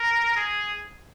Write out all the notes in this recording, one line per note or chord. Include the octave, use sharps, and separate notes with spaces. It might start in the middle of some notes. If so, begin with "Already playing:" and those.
Already playing: A#4
G#4